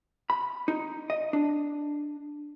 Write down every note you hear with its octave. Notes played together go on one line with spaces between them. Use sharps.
B5
D#4
D#5
D4